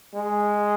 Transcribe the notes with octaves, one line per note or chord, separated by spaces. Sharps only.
G#3